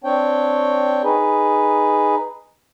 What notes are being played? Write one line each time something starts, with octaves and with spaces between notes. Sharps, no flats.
C4 D4 C#5 G5
D#4 G#4 B4